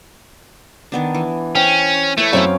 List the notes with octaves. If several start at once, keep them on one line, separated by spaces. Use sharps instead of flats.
D#3 B3 D4
E3
C#4 C5 G5
A3 E4 B4 C#5
F#2 C4 C#4 F5 G5 C#6